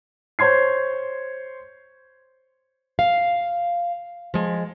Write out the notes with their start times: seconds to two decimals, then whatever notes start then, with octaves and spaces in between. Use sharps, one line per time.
0.39 C5 C#5 C6 G#6 C7
2.99 F5
4.34 F3 G#3